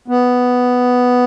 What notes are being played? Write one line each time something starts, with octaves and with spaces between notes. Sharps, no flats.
B3